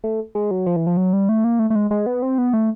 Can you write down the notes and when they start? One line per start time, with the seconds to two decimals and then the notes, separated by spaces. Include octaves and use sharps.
0.04 A3
0.35 G#3
0.51 F#3
0.66 F3
0.76 E3
0.87 F3
0.97 F#3
1.13 G3
1.29 A3
1.44 A#3
1.59 A3
1.70 A3
1.75 G#3
1.91 G#3
2.06 B3
2.22 C4
2.38 B3
2.53 A3